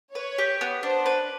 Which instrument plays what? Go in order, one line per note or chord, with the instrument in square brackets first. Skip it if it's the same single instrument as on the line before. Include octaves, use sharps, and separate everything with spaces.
[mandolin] B4 [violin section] C#5
[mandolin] G4
B3
[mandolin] D4 [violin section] C5
[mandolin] B4